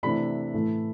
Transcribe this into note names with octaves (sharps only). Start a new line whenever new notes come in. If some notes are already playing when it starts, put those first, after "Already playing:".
C3 E3 A3 D4 B5
A2 E3 A3